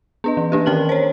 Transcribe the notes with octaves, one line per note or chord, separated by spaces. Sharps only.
B3 D4 D#5
E3
E3 A#3 D4 G4
D#3 C#4 A#4 A5 F6 F#7
C5 C#5